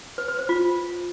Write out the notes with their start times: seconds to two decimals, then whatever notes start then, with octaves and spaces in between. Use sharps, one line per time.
0.18 B4
0.28 B4
0.39 C5
0.49 F4